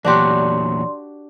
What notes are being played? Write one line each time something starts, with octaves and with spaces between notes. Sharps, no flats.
E2 A#2 F#3 D4 F#4 G4 D5 C6